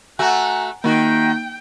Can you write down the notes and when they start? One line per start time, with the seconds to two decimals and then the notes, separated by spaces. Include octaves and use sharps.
0.19 A3 F#4 F#5 G#5 A#5
0.84 D#3 A#3 D#4 F#4 G5